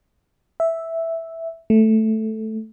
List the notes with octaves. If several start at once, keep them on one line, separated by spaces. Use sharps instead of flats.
E5
A3